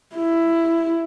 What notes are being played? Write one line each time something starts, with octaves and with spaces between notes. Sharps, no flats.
E4